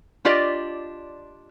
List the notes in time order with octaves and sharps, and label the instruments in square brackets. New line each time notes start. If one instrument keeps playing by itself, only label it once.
[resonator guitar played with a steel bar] D4 F4 G4 D5 D#5